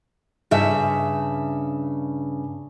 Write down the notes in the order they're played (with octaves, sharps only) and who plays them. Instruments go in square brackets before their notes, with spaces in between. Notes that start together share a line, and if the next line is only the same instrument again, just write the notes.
[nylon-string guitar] G2 C#3 E5